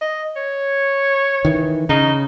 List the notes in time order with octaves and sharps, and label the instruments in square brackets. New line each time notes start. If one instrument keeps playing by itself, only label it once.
[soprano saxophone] D#5
C#5
[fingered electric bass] D#3 E3
[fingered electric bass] C#3 [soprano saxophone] D#4